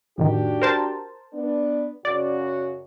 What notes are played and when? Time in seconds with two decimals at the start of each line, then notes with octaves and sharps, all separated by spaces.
0.18 F2 A2 D#3 D4 F#4 G4
0.62 A#4 C5 A5
1.33 B3 D4
2.05 F#2 C#3 F#4 D5